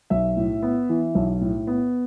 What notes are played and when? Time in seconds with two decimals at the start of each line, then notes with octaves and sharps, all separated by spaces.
0.10 B1 E5
0.37 A2
0.63 B3
0.89 E3
1.15 B1
1.41 A2
1.67 B3